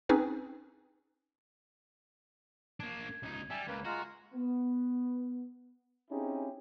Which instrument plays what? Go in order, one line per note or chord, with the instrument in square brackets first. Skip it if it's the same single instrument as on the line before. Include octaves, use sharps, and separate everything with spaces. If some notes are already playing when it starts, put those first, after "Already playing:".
[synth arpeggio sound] C4 C#4 D#4 G#4 B4
[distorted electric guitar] A#3 D4 [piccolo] G#6
[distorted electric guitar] C#2 D#4
[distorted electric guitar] G3 [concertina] E5 G#5 A5
[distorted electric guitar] C#2 [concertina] A#3 B4
[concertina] G#3 F4 A#5 [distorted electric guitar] F#4
[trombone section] B3
C4 C#4 D#4 E4 G4 G#4